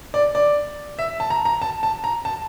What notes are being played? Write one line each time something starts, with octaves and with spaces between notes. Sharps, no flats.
D5
D5
E5
A5
A#5
A#5
A5
A5
A#5
A5